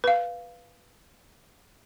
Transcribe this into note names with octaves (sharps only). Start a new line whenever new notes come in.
B4 F5